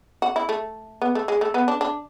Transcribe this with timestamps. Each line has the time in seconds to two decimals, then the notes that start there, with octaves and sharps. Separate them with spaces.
0.22 F#4
0.36 E4
0.49 A3
1.02 B3
1.15 A3
1.28 G#3
1.41 A3
1.54 B3
1.68 D4
1.81 D4